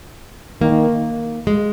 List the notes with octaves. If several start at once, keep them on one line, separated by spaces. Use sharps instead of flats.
D#3 A#3
G#3